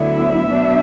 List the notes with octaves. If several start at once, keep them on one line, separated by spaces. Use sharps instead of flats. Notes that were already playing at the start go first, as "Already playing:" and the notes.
Already playing: D2 D3 F#3 B3 E4
E5
B2 F#3 B3 D4